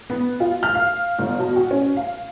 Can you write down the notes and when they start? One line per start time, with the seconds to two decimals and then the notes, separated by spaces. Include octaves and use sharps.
0.10 B3
0.40 F4
0.63 F6
0.75 F5
1.19 G1
1.39 B2
1.56 F#4
1.71 C#4
1.97 F5